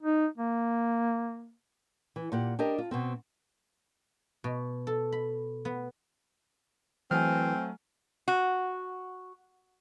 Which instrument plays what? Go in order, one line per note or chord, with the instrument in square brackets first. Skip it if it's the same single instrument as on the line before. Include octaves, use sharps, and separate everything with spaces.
[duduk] D#4
A#3
[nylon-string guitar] E3
A#2 G4 F#5
D4 G4 A#4 D#5
F4
B2 B3 C4
[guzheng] B2
A4
B5
B3
[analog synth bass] E3 [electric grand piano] F#3 A3 [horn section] C4 [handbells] G#5 F6
[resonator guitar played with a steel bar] F#4